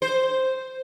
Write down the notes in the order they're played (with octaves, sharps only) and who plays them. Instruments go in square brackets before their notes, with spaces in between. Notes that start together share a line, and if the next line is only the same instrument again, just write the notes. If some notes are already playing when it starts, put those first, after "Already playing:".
[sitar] C5